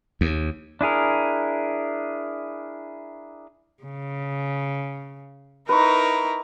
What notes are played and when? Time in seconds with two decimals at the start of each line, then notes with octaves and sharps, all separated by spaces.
0.21 D#2
0.81 D4 E4 G#4 A#4
3.82 C#3
5.69 D#4 E4 A#4 B4 C#6